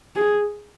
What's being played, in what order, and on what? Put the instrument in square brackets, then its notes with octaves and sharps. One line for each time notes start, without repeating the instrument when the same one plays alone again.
[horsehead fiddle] G#4